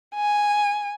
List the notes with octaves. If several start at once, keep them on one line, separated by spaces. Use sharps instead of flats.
G#5